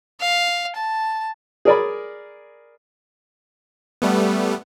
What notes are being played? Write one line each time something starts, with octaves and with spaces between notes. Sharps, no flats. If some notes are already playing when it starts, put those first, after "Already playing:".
F5
A5
G#4 A#4 D5 G#5 B5
G3 A3 B3